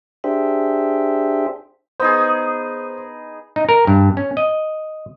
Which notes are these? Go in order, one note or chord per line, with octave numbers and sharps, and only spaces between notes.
D4 G4 G#4 C5 E5
B3 D#4 G#4 C5
D#4
A#4
G2
C#4
D#5